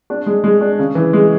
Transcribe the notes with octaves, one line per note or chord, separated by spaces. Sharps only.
D4
G#3
G#3
D4
C#3
E3
G#3